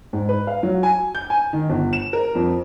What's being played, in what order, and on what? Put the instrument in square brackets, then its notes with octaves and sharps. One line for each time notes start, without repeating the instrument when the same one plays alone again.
[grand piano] G#2
B4
F5
F#3
G#5
G6
G#5
D#3
G1
E7
A#4
F2